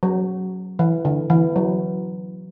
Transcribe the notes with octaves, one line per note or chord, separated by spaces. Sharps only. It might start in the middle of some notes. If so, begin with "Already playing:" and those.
F#3
E3
D3
E3
F#3